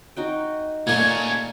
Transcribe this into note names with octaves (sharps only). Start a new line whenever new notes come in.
D#4 F#4 G5
A#2 A3 A#3 C#4 G#6
G#6